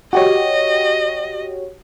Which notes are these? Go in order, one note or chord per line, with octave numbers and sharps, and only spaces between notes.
F#4 G4 C#5 D#5